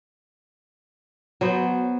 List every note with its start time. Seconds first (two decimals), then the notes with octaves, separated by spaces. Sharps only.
1.41 F#3 B3 C5